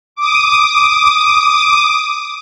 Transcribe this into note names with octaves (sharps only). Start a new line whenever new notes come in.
D6 D#6